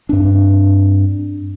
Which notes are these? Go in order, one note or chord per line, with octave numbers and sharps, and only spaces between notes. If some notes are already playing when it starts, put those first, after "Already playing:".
G2 C4 D4